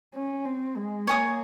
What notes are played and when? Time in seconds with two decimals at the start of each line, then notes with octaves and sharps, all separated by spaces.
0.15 C#4
0.46 C4
0.76 G#3
1.07 A#3 C#5 G#5 D#6